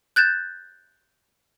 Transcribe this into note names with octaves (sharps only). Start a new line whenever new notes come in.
F#6 G6 A6 E7